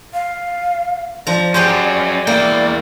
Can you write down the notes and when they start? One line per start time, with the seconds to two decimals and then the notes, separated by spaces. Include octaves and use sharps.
0.13 F5
1.27 F3 D5 A#5
1.54 F#3 C#4 G4 G#4 C5
2.27 E2 A#3 E4 D5 G5